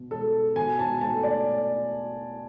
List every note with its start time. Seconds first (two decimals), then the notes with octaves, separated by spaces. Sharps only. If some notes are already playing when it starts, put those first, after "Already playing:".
Already playing: B2
0.11 G#3 A4
0.56 B2 G#5
0.79 A5
1.01 A3 A5
1.23 D5